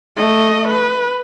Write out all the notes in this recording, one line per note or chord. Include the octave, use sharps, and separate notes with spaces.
A3 D#5
B4